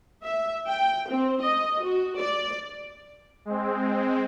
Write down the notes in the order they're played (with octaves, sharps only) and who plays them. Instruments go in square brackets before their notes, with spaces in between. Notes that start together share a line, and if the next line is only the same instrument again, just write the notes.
[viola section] E5
G5
C4
D#5
F#4
D5
[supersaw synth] G#3 C4